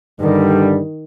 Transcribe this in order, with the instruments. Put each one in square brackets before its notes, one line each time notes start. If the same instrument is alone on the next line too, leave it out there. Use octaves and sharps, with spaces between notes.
[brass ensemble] G2 D3 G3 [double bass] D#3